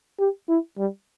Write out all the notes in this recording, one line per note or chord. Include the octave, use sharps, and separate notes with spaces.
G4
E4
G3